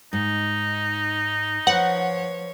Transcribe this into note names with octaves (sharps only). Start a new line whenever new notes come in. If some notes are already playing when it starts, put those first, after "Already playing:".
G#2 D#4
F3 B4 C#5 F#5